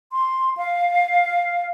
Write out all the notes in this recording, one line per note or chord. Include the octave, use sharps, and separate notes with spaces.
C6
F5